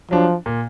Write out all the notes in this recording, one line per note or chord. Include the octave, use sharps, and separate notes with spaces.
F3 F#3 D4
A#2